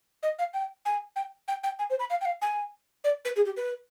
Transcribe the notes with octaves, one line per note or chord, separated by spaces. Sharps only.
D#5
F5
G5
G#5
G5
G5
G5
G#5
C5
B5
F5
G5
F5
G#5
D5
B4
G#4
G4
B4